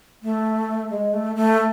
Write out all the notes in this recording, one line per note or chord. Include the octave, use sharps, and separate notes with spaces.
A3
G#3
A3
A3